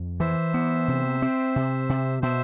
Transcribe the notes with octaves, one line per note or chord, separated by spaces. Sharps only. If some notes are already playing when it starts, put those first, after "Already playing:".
Already playing: F2
E3 C5 E5
B3
C3
C4
C3
C3
B2 C5 E5